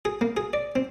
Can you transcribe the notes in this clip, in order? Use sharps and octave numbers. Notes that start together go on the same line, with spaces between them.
G#4
A#3
G#4
D5
C4